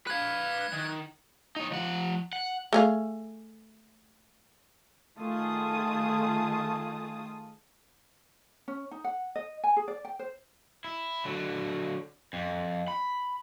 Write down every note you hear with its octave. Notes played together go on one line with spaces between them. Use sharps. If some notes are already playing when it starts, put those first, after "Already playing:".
B4 F5 F#6 G#6
D#3
D#4 C#5
F3 F#5
F#5
A3 G#4 F5
D#3 A3 F4 G#4 A5 D#6
C#4
D#4
F#5
D#5
G#5
G#4
D5
G5
C5
E4
D3 F#3
F2
B5